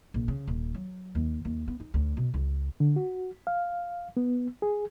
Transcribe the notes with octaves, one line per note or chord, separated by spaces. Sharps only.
A#1
C#3
D#1
F#3
D#2
D#2
B3
D#4
D2
B2
C#2
D3
F#4
F5
B3
G#4